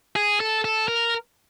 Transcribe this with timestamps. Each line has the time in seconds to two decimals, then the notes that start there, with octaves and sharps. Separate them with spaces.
0.16 G#4
0.40 A4
0.64 A4
0.88 A#4